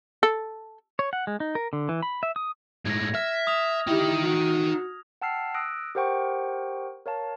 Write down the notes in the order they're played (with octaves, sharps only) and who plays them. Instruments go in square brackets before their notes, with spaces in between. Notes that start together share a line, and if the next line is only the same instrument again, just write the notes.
[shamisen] A4
[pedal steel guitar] C#5
F#5
G#3
D#4
A#4
D3
E3
B5
E5
D#6
[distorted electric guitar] A2 G#3 [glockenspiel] G#6 A#6
[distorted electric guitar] E5 [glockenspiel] F6
[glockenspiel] D#6 F7
[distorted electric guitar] D#4 G5 [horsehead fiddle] E4 G4
[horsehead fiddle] F#4
[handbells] F#5 G5 A5 E6 F6 C7
D#6 E6 F#6 A#6 D7
G4 A#4 C5 F#5 G5 C#6
A#4 C#5 F5 A5